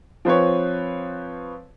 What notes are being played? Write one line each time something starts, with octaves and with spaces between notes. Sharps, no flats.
F3 C4 B4 C#5